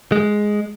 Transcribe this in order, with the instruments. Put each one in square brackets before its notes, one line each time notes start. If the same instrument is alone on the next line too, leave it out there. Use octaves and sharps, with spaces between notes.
[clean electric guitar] G#3